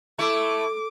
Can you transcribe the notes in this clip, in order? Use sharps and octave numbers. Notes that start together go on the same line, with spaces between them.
A3 E4 A4 D6